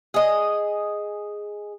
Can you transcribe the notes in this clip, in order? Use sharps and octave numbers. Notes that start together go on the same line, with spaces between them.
G#4 D#5